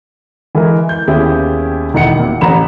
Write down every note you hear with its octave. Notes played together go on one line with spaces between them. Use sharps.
E3 G#3 E4 A#4
G6
D#2 B3 C#4 E4 G4 G#4
E1 D#3 E4 F#5 C#7
A#2
A1 A#5 B5 E7